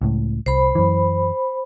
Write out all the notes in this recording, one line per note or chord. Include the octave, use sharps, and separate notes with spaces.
C#2 A2
C2 C5 B5
F#2 E3